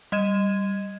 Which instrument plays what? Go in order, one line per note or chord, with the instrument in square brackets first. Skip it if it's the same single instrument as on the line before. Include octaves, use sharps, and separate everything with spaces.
[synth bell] G3 D#5 G#6 D#7 E7